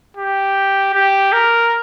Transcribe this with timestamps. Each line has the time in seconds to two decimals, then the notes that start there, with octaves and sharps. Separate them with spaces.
0.17 G4
0.94 G4
1.32 A#4